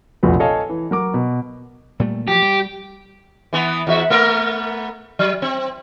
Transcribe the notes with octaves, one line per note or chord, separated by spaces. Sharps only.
F1 A#1 F4 F#4 B4
A4 C#5 D#5 F5 G#5
E3
F#3 A#4 D6
B2
A#2 G3 A3
F3 F#3 G4
G3
E3 B3
E2 F#4 E5
A3 B3 A#4
F#3
C4